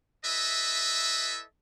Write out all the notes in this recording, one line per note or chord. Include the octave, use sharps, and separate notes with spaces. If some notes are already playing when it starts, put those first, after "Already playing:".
E4 A4 B4 D#5 E5